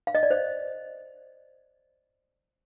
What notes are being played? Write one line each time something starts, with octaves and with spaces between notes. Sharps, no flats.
F5
D#5
D5
C5 D#5